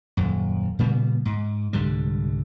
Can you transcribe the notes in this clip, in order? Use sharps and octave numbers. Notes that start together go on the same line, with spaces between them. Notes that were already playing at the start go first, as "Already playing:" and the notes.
D#1 F#2
A#2 C#3 G3 B3
G#2
C2 G#2 D3 G3